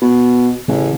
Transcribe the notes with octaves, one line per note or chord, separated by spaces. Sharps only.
B2
A1 C#3